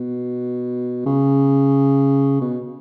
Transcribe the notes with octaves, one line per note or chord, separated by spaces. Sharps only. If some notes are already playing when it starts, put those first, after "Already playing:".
Already playing: B2
C#3
B2